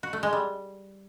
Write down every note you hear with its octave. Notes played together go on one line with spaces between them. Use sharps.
F#4
A3
G#3
G3